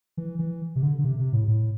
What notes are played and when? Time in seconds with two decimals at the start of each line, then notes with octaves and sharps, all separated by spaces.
0.17 E3
0.39 E3
0.76 C3
0.82 D3
0.99 D3
1.04 C3
1.19 C3
1.33 A2
1.48 A2